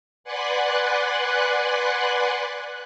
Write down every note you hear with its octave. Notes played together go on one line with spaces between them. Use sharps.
B4 D5 F#5 G#5 C6 F#6